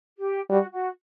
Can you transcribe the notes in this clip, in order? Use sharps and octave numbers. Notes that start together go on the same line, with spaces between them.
G4
G3 F#4
F#4